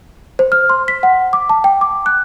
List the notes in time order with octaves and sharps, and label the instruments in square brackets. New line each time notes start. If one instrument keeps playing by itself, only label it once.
[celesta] C5
F6
C6
B6
F#5
D6
A5
G5
D6
F#6